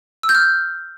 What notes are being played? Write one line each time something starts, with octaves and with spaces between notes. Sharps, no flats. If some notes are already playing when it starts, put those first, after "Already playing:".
E6
G6
F6